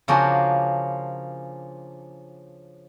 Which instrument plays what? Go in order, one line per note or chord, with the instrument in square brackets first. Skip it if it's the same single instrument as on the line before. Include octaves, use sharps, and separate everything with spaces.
[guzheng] C#3 F3 A#3 C#4 D4 F#4